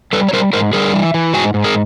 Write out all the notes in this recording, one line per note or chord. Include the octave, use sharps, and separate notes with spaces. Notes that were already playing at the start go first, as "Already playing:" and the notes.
G3 A4 B4
C#5
G3 A#4 C5
G#2 A#4 C5
G3 G#4 A#4
E3
E3
G#2 F#4 G#4
G#2
G#4 A#4